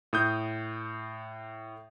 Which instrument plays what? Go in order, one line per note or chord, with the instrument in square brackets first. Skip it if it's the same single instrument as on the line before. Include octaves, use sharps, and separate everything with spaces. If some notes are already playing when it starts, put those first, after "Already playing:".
[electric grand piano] A2 D#6 G6